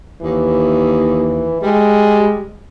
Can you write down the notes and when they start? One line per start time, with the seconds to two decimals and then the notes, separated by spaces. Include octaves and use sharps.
0.22 D#2 E3
1.62 G3 G#3